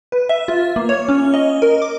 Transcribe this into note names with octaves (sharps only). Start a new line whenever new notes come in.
B4
E5
F4
A#3
C#5
C#4
D#5
A#4
D6